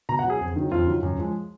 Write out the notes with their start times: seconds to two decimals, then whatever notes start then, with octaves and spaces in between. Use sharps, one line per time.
0.09 B2 A#5
0.19 F#5
0.24 F#3
0.30 G#4
0.40 F2
0.56 D#3 F#3
0.71 F2 F4
0.87 D#3 F#3
1.03 F#2
1.18 F3 G#3